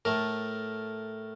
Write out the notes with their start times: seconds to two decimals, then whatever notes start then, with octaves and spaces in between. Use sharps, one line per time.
0.05 A2 A3 A#4